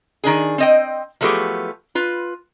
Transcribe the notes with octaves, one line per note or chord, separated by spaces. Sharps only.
D#3 D4 G#4
C4 D#5 G5
F3 F#3 A3 B3 G4 G#4
F4 B4